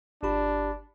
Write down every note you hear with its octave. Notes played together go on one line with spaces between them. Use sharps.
G1 D4 G4 B5